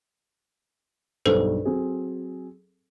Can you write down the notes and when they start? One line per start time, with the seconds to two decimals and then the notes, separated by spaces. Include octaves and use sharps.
1.26 B1 G2 A4 B4 C5
1.65 F#3 C4 G#4